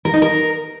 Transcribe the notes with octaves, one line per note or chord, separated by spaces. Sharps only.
A#4
D#4
A#4